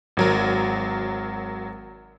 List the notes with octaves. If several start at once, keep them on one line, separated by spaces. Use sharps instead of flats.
G#1 F#3 A#4